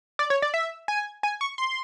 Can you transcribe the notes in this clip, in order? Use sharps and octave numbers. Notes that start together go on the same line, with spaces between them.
D5
C#5
D5
E5
G#5
G#5
C#6
C6